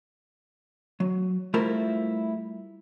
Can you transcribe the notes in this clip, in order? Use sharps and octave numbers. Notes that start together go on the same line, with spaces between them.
F#3
G3 A3 E4 F4 A#4 C5